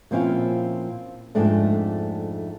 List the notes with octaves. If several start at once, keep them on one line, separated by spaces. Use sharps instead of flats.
A#2 F3 C4 C#4 E4 F5
F2 G#2 A3 C4 D4